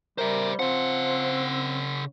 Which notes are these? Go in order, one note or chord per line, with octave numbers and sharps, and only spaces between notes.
G3 A#4 C5 E5
C#3 F3 C4 F#5